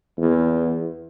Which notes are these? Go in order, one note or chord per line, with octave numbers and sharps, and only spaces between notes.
E2